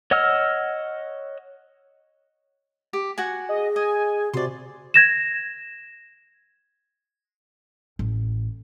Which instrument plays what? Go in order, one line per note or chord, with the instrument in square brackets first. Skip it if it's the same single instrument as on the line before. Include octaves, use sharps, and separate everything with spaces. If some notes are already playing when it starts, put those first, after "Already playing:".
[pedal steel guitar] C#5 D#5 F#5 E6 F6
[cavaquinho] G4
F#4 F#5 G#5
[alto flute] G#4 [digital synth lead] D#5
[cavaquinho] D#5 [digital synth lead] G#5
[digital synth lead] C3 [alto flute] F#4 [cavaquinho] D5 C6
[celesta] G#6 A#6 E7
[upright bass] A1